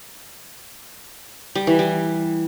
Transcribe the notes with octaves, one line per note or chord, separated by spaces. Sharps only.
G3
E3
G3